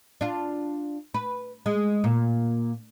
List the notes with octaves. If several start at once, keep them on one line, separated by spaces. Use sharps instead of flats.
D4 F4
B4
G#3
A#2